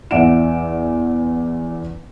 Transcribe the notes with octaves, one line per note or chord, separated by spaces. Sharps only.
E2 D5 E5 F#5 D7 E7